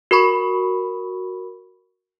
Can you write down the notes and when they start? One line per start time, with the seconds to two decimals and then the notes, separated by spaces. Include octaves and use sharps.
0.11 F#4 A#4 B5 C#6